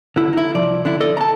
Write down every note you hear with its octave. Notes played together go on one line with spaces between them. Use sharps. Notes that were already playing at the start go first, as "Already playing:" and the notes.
D3 E4
D#4 E4
C2 F3 D5
D3 D4 E4
A4 D5 D#5
A5 A#5